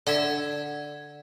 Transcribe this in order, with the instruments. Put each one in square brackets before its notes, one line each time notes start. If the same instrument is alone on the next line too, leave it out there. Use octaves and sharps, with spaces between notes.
[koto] D3 E5 [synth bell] D5 F#5 G#6